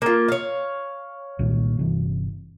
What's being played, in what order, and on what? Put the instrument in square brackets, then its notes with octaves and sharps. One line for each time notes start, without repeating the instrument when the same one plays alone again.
[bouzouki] A#3 F4
C#5 F5
[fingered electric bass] C2 A#2 D#3
G1 C3 E3